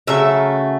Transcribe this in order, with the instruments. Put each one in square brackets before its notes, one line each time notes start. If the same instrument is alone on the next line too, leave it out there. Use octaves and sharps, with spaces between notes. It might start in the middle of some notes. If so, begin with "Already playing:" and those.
[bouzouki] C#3 F#3 A3 E5